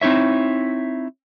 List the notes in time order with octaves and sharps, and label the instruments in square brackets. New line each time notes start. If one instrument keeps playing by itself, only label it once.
[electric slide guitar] C4 D#4 E4 C#5 E5